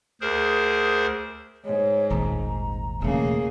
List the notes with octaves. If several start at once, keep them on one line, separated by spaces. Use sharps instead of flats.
D2 G#4 A#4 C5
G#2 C#5
D#1 G#1 D#2 A#5
E1 C#3 A3 A#3 G#4